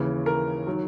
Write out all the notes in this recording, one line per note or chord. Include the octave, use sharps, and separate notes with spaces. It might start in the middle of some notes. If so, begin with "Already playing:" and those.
Already playing: D#2 C#3 E3
A#4
D#3 F#3